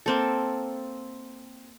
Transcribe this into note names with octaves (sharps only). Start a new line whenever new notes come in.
A#3 C4 A4